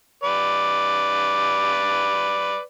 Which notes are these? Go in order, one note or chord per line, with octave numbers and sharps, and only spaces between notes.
B4 D5